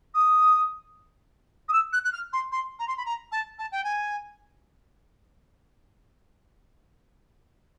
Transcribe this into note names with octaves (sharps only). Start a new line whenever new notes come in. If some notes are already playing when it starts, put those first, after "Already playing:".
D#6
D#6
E6
F#6
F#6
F6
C6
C6
A#5
C6
B5
A#5
A5
A5
G5
G#5